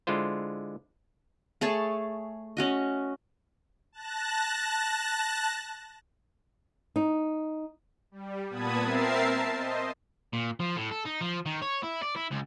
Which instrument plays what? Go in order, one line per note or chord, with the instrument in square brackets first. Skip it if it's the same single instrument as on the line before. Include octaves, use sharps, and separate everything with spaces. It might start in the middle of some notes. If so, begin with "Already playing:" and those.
[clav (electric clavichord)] D3 G#3 E4 F4 C5
[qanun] A3 G#4 C#5 A5
C#4 F#4 D#5
[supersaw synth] A5 F#6 A#6
[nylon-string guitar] D#4
[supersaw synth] G3
A#2 B3 A5 B5 D#6 G#6
C4 A#4 E5 A6 C7
A5
C5 D#5
[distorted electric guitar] A#2
F3
A2
A4
D#4
F3
D#3
C#5
E4
D5
E4
C#2